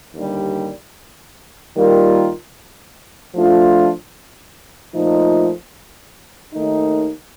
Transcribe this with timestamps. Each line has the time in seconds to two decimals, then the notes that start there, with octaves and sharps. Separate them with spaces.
0.15 D#2 D3 G3
1.75 D#3 G3 A#3 F4 A#4
3.35 F3 A3 D4 F4
4.94 A#2 F3 A3 D#4
6.54 D#2 D#3 A3 D#4